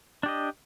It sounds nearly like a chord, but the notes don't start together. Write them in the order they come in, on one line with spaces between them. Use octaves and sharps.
D4 G4 D#5